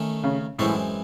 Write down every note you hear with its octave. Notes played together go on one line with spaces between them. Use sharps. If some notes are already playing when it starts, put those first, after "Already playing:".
Already playing: D#3 A3 C#4
C#3
F#2 A2 E3 G#3 C4 E4